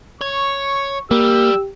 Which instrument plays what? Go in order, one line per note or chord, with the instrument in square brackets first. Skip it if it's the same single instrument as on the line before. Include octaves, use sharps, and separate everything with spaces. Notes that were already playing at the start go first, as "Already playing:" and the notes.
[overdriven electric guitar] C#5 [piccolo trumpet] C#6
[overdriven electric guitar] G3 [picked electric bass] A#3 [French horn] G4 [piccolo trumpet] E6